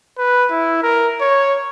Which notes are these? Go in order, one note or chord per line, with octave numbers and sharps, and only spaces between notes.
B4
E4
A#4
C#5